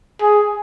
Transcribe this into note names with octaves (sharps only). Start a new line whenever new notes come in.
G#4